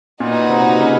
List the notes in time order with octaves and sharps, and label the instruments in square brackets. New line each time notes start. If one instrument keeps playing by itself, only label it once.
[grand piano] A#2 [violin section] D#4 F#4 B4
[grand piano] C3
C#3